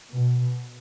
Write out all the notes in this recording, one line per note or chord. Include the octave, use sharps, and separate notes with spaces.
B2